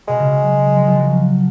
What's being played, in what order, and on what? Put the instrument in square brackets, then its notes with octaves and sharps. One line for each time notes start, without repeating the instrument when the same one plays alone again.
[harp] B2 [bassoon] G#3
[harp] C#3
F#3
F3
F3
F#3